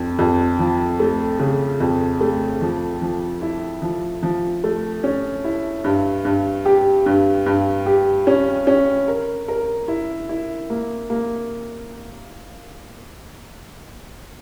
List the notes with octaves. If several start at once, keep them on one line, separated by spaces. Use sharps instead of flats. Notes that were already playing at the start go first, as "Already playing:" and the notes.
Already playing: F2
F2
F3
A3
C#3
F2
A3
F3
F3
E4
F3
F3
A3
C#4
E4
G2
G2
G4
G2
G2
G4
C#4
C#4
A#4
A#4
E4
E4
A#3
A#3